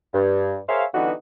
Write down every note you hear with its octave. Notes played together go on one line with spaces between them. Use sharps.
G2
G#4 A#4 C5 C#5 E5 F5
D3 E3 G3 B3 D#4 F#4